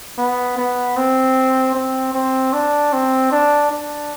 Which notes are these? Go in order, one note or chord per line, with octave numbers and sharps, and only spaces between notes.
B3
B3
C4
C4
C4
D4
C4
D4
D4